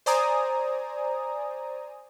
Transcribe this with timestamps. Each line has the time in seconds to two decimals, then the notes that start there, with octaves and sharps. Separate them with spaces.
0.06 C5 D5 G#5 A#5 D#6